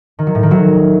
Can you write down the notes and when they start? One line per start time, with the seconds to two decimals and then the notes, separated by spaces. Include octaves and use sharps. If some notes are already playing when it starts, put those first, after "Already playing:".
0.19 D#3
0.27 F#3
0.35 A2
0.43 D#3
0.51 F#3